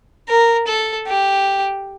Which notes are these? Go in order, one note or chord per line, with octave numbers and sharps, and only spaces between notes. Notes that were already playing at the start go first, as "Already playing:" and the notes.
A#4
A4
G4